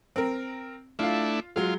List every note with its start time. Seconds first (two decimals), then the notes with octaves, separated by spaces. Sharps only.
0.16 C4 A#4
0.99 A3 D4 E4 F4 F5
1.56 F#3 G#3 F4